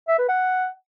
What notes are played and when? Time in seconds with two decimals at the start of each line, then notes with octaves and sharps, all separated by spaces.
0.08 E5
0.18 B4
0.28 F#5